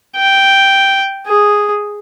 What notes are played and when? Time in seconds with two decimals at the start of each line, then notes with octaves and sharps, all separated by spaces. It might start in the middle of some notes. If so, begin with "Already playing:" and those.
0.16 G5
1.27 G#4